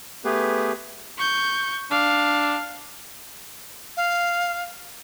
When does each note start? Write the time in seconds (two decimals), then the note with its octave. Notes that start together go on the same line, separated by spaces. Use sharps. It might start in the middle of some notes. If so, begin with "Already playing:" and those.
0.25 A3 B3 G4 G#4 B4
1.18 C#6 G6
1.91 D4 F5
3.97 F5